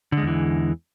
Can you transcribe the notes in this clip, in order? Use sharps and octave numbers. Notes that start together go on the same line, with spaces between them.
E2 D3 E3 G#3